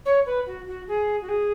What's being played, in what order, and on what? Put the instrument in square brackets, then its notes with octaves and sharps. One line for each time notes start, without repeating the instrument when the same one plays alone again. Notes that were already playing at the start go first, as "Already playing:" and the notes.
[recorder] C#5
B4
F#4
F#4
G#4
F#4
G#4